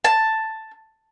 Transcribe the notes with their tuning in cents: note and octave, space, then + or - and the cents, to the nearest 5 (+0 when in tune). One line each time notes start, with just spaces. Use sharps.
A5 +5